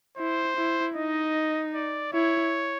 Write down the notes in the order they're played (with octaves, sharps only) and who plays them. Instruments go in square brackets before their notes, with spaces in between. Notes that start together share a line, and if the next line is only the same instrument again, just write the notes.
[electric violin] E4 [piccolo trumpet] C5
[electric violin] E4
[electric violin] D#4 [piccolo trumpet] D#5
[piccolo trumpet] D5
[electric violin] E4 [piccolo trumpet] C#5